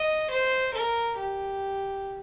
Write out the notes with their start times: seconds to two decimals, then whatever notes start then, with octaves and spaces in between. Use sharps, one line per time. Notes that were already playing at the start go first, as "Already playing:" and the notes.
Already playing: D#5
0.31 C5
0.74 A#4
1.17 G4